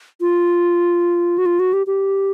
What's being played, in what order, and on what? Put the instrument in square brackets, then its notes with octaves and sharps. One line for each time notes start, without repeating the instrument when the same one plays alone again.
[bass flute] F4
F#4
F4
F#4
G4
G4